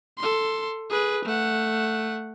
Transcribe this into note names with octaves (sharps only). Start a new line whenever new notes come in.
A4 C6
G#4 B4
A3 F#5